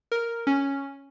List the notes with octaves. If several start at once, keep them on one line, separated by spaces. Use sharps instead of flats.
A#4
C#4